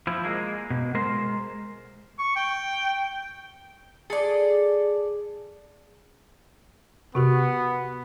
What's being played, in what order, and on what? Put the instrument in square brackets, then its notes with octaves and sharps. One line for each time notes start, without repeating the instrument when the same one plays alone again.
[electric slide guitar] F3 E4
G#3 A#3
B2
G#3 A#4 C5
[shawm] C#6
G5
[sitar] G#4 [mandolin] A4 D5
[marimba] C3 F#4 G4 [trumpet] B3